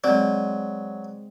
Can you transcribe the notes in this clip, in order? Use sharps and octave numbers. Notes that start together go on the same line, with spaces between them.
F#3 G#3 C4 D5